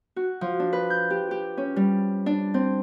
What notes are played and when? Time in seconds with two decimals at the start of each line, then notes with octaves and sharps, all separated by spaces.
0.16 F#4
0.41 F3
0.60 D4
0.73 B4
0.90 G6
1.10 G4
1.31 G4
1.57 C#4
1.76 G3
2.26 D4
2.54 C4